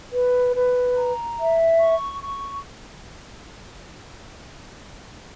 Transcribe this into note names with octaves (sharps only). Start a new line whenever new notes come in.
B4
B4
A#5
E5
C#6
C#6